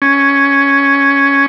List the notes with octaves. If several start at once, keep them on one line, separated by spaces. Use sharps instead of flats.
C#4